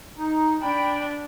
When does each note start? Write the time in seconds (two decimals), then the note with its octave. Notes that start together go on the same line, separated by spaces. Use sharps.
0.18 D#4
0.62 D4 G5 B5